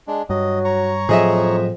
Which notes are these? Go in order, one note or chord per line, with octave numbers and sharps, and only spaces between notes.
G#3 D4
G2 F#3 D#5
C#5 A#5 C#6
F2 A2 F3 F#3 G#4 D#5 E5